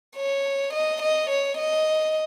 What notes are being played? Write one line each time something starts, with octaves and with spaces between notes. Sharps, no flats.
C#5
D#5
D#5
C#5
D#5